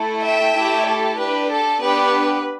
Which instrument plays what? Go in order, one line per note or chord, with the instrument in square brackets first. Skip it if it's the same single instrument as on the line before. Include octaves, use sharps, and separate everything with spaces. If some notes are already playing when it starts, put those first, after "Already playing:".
Already playing: [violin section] A3 E4 A4
E5 G5
A3 E4 G4
A4
D4 G4 B4
A4
B3 D4 G4 B4